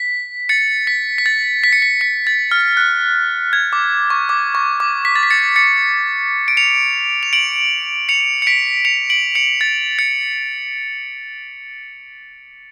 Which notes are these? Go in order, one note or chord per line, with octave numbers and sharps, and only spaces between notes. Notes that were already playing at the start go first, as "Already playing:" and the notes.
Already playing: B6
A6 C#7
B6
B6
A6
B6
C#7
B6
B6
A6
F6
F#6
G#6
D6
C#6
D6
C#6
D6
B6
A6
B6
A6 C#7
A6 C#7
D7
C#7 F7
F7
D7 F#7
C#7 F7
C#7
B6 D7
C#7 F7
D7 F#7
C#7 F7
A6
A6 C#7